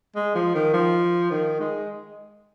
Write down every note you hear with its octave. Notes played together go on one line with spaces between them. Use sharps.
G#3
F3
D#3
F3
D#3
G#3